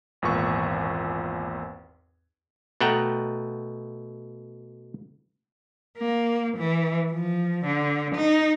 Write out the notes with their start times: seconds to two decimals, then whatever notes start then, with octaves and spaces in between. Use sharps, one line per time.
0.22 G#1 E2 A#2 B4 C#6
2.80 B2 A3 F#5 G5 A#5
5.98 A#3
6.58 E3
7.10 F3
7.65 D3
8.15 D#4